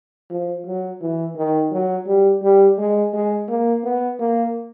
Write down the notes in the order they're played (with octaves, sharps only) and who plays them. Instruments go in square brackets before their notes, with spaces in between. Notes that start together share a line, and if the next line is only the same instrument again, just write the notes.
[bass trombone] F3
F#3
E3
D#3
F#3
G3
G3
G#3
G#3
A#3
B3
A#3